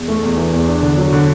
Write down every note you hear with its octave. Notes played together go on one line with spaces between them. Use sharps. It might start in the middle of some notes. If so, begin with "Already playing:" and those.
Already playing: E2
A3
E2
E3
E2
D4
D3
F#3
D3